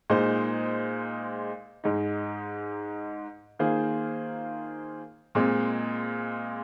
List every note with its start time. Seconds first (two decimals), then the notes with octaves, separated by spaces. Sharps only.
0.10 A#2 G#3 D#4 C5
1.84 G#2 G#3 D#4
3.59 D#3 A#3 F4 G#4 C5
5.35 A#2 G#3 C4